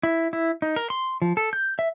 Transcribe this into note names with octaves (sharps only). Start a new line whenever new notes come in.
E4
E4
D#4
A#4
C6
F3
A4
G6
E5